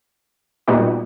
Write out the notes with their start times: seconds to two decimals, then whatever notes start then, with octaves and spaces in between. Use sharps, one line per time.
0.67 A#2 G3 B3 D#4 F#4